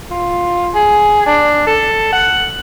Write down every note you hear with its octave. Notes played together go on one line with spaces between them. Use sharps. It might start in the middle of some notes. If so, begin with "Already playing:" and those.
F4
G#4
D4
A4
F#5